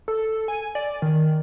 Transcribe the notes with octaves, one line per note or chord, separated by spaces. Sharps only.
A4
G#5
D5
D#3